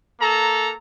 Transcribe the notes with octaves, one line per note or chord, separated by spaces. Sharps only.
A#3 A4 A#5